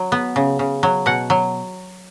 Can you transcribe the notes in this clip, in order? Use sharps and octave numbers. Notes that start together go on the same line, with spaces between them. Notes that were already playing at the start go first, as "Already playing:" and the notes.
Already playing: F#3
B3
C#3
C#3
F#3
B2 F#5
F#3